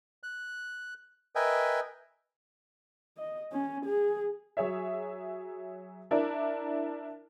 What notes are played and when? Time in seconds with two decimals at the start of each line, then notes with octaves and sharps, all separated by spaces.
0.23 F#6
1.35 A#4 B4 D#5 E5 G5 G#5
3.18 D#5
3.52 C#4
3.86 G#4
4.57 F#3 G#4 C#5 E5
6.11 D4 E4 A#4 D5